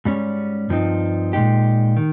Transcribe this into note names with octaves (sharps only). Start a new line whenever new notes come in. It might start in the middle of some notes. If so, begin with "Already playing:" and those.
G#2 G3 C#4
G2 F3 C4 D#4
A#2 G#3 D#4 G4
D#3